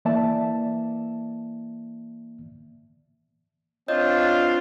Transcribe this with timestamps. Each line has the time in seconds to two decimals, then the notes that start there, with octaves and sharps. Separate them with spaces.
0.05 E3 A#3 D5 E5 A5
3.88 C4 D4 F4 C#5 D#5 G6